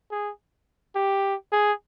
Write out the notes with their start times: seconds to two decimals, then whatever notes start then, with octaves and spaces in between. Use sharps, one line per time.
0.11 G#4
0.95 G4
1.53 G#4